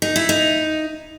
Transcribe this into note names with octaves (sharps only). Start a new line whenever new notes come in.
D#4
E4
D#4